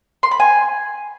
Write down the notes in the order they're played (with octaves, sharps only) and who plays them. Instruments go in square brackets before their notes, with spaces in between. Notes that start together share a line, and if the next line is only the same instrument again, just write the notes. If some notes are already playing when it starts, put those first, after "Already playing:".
[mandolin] C6
B5
G#5